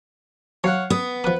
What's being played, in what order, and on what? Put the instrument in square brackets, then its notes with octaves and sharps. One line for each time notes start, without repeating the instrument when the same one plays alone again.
[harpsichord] F#3 [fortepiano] C#5 F5 F#5
[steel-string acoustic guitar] B3 [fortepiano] D#6
[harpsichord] F3 D#6 [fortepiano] B4